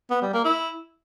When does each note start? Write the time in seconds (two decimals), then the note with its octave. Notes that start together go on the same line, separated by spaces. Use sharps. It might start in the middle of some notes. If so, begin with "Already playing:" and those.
0.11 B3
0.22 G3
0.33 A#3
0.45 E4